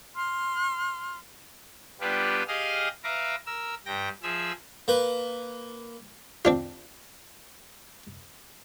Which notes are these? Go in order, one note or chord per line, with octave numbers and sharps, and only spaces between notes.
C6 F6
G3 B3 D4 F4 G4 B4
G4 G#4 D#5 F5 D#6 F6
B4 E5 F5 A#5 D6
A#4 E6
G2 G5 A#6
F3 G#4 E5 E6
A#3 B4
C4 D4 F4